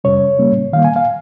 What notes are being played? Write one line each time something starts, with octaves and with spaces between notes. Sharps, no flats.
F2 C3 G3 C#4 C#5
C#3 G3 A#3 C#4
D#3 G3 A#3 F5
G#5
F5